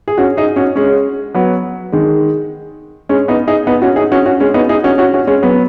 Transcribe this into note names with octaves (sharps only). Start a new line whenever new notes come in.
G#4
C#4 F#4
D#4 G#4
C#4 F#4
G#3 C#4
F#3 B3
D#3 G#3
G#3 C#4
B3 D#4
D#4 G#4
B3 D#4
C#4 F#4
D#4 G#4
C#4 F#4
C#4 F#4
G#3 C#4
B3 D#4
D#4 G#4
C#4 F#4
C#4 F#4
C#4 F#4
G#3 C#4
F#3 B3